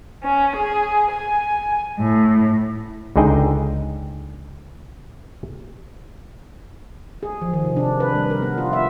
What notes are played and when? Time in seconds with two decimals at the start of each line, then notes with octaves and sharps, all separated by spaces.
0.22 C#4
0.57 G#4
1.11 G#5
2.00 A2
3.16 C#2 D3 D#4 G#4 G5
7.23 G#4
7.42 F3
7.53 D#3
7.65 C3
7.76 D4
8.00 B4
8.15 G3
8.30 A#4
8.42 B3
8.58 F4
8.73 E5